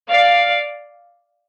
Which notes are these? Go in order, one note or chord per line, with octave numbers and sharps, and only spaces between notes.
D5 F5